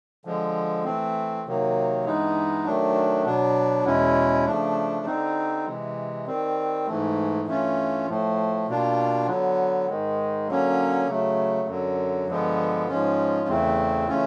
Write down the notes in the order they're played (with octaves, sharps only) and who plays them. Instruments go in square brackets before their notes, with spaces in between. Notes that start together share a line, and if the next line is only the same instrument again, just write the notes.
[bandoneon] D3 F3 G#3
E3 A3 C4
C3 D#3 F#3 A#3
G2 E3 G#3 B3 D#4
D#3 F#3 A3 D4
B2 F#3 B3 D4
E2 B2 G#3 C#4 E4
C#3 F3 A3 D4
D3 G3 C4 D#4
C3 E3 G#3
D#3 G3 C4
G#2 E3 A3
G2 E3 A3 C#4 F4
A2 F3 A3
B2 G3 A#3 D4 F4
D3 F#3 B3
G#2 D#3 G#3
D3 F#3 A#3 C#4
C#3 F#3 A3
F#2 D3 F#3
G2 D3 F3 G#3 B3
G#2 F3 G#3 C#4 F4
E2 C#3 E3 A3 C4
C#3 E3 A3 C#4 F4